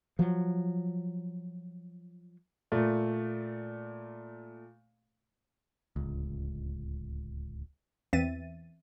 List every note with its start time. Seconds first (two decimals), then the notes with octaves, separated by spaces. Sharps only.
0.19 F3 F#3
2.72 A#2 A3
5.96 D1 C#2
8.13 E2 E3 C4 E5 A6 D#7